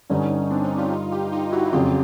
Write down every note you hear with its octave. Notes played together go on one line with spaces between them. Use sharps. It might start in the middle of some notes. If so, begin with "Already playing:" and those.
G2 D3 G3 C#4 D#4
C4 D4
C#4 D#4
F4 G4
D#4 F4
F4 G4
D#4 F4
E4 F#4
F#4
F2 C#3 F#3 F4 G4